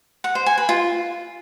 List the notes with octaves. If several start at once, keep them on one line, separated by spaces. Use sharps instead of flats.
F#5
C5
G#5
B4
F4